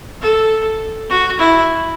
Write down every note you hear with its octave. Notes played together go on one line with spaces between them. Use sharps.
A4
F#4
E4